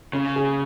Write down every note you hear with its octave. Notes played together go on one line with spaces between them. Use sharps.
C#3 C#4
G#4